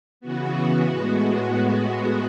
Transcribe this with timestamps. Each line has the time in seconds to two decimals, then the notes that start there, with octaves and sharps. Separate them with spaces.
0.20 C#3 E3 B3 F#4
0.86 A2 G#3 B3 F#4